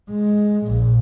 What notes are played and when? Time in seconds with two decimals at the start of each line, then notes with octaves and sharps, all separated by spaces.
0.10 G#3
0.66 A#1 A#2